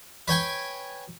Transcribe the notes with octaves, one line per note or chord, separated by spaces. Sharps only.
B4 C#5 G5 G#5